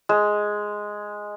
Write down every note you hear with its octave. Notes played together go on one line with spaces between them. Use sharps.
G#3